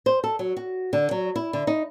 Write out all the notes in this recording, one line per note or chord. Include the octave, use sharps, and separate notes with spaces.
C5
A4
F#3
F#4
D3
F#3
E4
D3
D#4